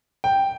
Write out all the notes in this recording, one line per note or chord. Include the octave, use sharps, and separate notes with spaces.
G5